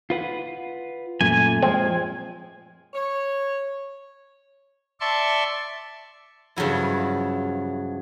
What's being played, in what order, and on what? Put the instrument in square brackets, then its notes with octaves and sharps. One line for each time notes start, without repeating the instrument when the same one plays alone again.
[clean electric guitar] F4 B4 F#5
[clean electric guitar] F#2 A#2 A3 [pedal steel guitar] G#5
[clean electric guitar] F3 G#3 [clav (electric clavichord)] C4
[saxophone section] C#5
[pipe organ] D5 E5 A5 C6 C#6
[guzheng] G2 C#3 F3 F#3 E4